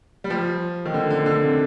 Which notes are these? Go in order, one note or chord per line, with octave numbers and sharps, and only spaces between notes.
G3
F3
D#3
D3
D3
D3
C3